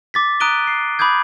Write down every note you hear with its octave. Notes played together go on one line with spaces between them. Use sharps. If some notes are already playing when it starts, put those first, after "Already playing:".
D6 A6 B6
A#5 D#6 F#6 D7 D#7 G7
C7
B5 D6 D#6 G6 G#6